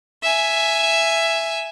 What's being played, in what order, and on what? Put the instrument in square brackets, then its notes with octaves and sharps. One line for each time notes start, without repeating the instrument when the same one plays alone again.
[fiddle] E5 G#5